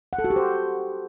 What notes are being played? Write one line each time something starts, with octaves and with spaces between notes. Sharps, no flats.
F#5
A4
F#4
G4
C5